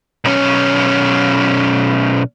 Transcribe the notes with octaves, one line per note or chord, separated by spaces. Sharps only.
B1 C#4